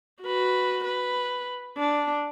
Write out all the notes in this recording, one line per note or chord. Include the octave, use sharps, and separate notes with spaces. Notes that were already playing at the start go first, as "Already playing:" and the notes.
F#4 B4
B4
D4